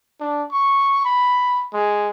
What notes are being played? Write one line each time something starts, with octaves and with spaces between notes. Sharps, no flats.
D4
C#6
B5
G#3